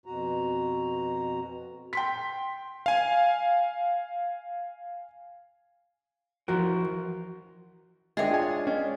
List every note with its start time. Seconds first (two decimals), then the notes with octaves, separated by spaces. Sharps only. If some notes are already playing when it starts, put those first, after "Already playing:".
0.06 F2 B2 F#4 A#5
1.93 G5 C6 B6
2.86 F5 G#5
6.48 E3 F3 F#4 A#4
8.17 G#3 D4 G#4 C#5 D#5 E5 G5
8.31 F4 G#5
8.67 C#4 D#5